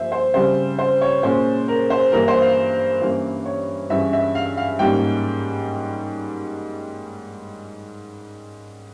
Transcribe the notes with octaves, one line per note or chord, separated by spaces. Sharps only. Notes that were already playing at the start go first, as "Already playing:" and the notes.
Already playing: G2 F3 A#3 C5 E5
C5
C#3 G3 C4 C5
C5
C#5
A#2 G#3 C#4 C5
A#4
C5
G2 E3 A#3 A#4
C5
F5
G2 E3 A#3 C#4 F5
C#5
G2 E3 G#3 C#4 E5
E5
F5
F5
G#2 G3 A#3 C#4 G5